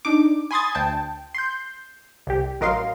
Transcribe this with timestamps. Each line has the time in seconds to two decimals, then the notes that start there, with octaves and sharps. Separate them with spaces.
0.05 D4 D#4 D6
0.51 G#5 B5 C6 D#6 G#6 A6
0.75 D2 G5 A5
1.34 C6 G6
2.27 C2 G4
2.60 A1 F#3 A#4 D#5 F5 C6